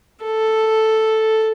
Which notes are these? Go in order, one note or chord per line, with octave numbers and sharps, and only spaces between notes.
A4